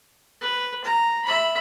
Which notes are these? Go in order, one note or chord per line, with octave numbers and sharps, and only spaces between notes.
B4
A#5
E5 B5